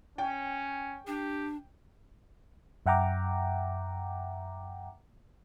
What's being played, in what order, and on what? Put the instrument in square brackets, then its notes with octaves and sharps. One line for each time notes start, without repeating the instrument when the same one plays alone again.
[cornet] C#4 [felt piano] G5
[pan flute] D4 [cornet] G4
[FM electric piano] F#2 E5 F#5 G5 A#5 D6